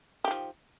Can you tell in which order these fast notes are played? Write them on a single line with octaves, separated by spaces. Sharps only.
G4 D#3 F3